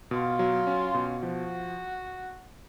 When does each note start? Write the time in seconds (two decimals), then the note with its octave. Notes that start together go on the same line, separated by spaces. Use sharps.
0.11 B2 F4
0.39 F#3
0.67 C#4
0.94 B2
1.23 F3 F#4